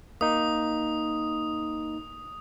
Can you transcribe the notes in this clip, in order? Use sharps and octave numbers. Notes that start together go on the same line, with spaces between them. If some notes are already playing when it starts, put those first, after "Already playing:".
A#3 D#4 D#6